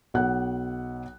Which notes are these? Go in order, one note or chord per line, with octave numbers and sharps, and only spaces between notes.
B1 F#5 F#6